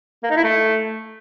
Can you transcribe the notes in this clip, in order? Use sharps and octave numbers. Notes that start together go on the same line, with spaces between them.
A#3
D#4
E4
A3